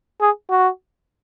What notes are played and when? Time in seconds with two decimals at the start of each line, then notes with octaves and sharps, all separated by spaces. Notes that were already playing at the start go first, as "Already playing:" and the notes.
0.21 G#4
0.50 F#4